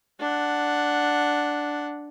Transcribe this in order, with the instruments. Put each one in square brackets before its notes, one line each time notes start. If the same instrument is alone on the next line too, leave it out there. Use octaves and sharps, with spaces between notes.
[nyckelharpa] D4 F#5